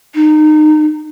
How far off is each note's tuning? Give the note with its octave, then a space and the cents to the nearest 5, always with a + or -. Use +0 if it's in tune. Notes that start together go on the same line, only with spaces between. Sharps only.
D#4 -25